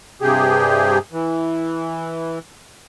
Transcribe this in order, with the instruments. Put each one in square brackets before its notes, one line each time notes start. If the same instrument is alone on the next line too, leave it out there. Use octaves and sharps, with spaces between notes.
[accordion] G2 C3 G4 G#4
E3